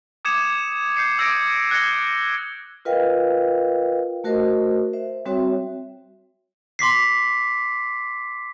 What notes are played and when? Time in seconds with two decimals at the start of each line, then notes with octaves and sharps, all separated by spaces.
0.25 D6 D#6 G#6 C#7 E7 F7
0.96 G6 C7 C#7 E7
1.18 D6 E6 G#6 A#6 C#7 D7
1.71 F#6 G#6 A#6 C#7 G7
2.85 F4 A#4 B4 D#5 F5 G5
4.24 A3 F#4 A#4 C5 D#5
4.93 C5 E5
5.26 G3 C4 F#4 C#5 E5 G5
6.79 C6 D6 B6 C7